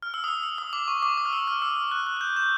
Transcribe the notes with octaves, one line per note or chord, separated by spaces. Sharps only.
F6
E6
D#6
E6
E6
D#6
D6
C#6
D6
D#6
F6
E6
F6
E6
F6
F#6
F#6
F#6
G6
G6